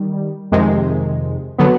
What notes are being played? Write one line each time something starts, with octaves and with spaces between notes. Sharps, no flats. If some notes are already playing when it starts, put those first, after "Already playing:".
Already playing: D#3 G3
F2 C3 D#3 G#3
D3 F#3 B3